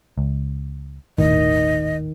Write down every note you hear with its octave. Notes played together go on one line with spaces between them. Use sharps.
C#2
D#1 G#1 A2 D#3 D#5